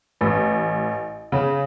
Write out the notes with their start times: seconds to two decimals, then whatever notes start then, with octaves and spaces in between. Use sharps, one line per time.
0.21 A1
1.32 C#3